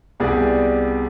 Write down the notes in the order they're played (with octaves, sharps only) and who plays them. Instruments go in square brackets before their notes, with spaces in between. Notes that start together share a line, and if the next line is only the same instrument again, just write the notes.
[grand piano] C2 B3 G4 G#4 D5